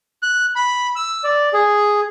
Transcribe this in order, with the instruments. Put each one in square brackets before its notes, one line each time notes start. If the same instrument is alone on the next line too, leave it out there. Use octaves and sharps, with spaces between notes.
[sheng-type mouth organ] F#6
B5
E6
D5
G#4